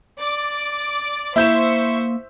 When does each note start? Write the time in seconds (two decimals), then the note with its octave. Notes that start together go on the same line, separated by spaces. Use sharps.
0.20 D5 D6
1.36 A#3 E4 C5 E5 C#6 G6 E7